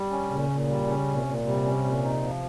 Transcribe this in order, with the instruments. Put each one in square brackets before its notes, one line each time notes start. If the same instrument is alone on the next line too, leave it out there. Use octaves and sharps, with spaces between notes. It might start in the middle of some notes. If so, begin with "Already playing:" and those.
Already playing: [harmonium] G3
C#4
[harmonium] A#2 [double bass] C#3
[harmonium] A#2
G3
[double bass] C#3 [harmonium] C#4
[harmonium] A#2
[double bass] C3
[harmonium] A#2
[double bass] C3 [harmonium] G3
[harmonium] C#4
A#2
D#4
F3